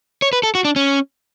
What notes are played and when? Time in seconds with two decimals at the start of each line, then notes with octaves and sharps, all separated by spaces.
0.22 C#5
0.33 B4
0.43 A4
0.55 F#4
0.65 D4
0.76 C#4